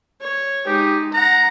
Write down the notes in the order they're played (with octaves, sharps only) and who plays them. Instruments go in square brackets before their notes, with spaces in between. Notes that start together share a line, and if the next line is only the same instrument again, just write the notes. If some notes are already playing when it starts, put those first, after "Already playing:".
[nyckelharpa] C#5
[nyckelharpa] G#3 D#4 [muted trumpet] G4
[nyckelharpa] F#5 [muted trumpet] A#5